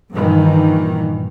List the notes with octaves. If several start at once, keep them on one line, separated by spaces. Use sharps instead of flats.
G2 A#2 D#3 E3